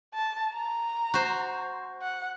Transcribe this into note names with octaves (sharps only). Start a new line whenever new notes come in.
A5
A#5
F#4 C5
F#5